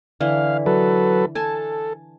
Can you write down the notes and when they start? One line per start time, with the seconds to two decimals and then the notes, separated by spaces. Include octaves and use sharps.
0.21 D3 E3 F5
0.66 F#3 A4 B4
1.35 A4 G#5 A5